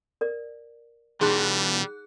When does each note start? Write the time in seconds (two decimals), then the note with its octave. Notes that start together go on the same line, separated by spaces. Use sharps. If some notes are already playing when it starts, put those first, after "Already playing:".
0.21 A#4 D5
1.21 B2 E3 G3 D#4 G#4 C6 F#6